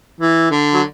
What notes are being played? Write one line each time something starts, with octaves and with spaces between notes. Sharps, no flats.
E3
D3
F#3